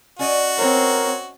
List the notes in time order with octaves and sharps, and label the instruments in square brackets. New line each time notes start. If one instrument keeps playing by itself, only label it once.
[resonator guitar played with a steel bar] C#4 D5 D#5 [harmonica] F#4
[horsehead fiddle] C4 C#5 [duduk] A#4